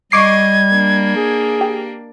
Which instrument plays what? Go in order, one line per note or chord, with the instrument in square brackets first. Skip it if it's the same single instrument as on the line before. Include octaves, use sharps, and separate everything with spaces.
[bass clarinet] G3 [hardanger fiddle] D#5 [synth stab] C#6 D6 C7 [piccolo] G#6
[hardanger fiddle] A#3 D4
[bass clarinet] G#4
[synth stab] G4